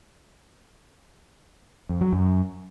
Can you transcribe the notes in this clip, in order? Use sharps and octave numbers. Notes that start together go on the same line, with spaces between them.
F2
F#3
F#2